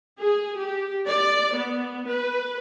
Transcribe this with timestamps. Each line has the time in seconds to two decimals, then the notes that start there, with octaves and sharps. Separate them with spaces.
0.18 G#4
0.57 G4
1.07 D5
1.53 B3
2.07 B4